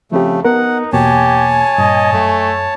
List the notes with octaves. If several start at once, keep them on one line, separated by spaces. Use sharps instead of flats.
C#3 F3 A3 C4 G4
B3 D#4 A#4 F#5
E2 B2 A#3 G4 C#5 G#5 A5
G2 A#2 D#5
F#2 A3